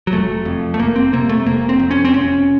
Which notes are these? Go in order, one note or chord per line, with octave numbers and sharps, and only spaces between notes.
F#3
F1 A3
F2
A3
F1 A#3
C4
C3 A#3
A3
F1 A#3
C4
F2
C#4
C4
F1 C#4